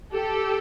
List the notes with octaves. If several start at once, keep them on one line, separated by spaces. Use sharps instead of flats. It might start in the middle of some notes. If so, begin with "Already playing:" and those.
G4 A4